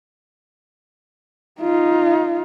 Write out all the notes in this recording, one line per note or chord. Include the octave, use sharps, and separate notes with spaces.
D#4 F4